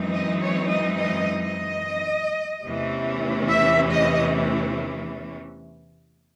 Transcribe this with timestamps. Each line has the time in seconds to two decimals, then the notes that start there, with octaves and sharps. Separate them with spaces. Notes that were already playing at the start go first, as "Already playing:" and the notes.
Already playing: F#2 E3 G#3 C4 D#4
0.12 D#5
0.41 C#5
0.69 D#5
0.97 D#5
1.40 D#5
2.65 E2 C3 E3 A3 C#4
3.50 E5
3.92 D#5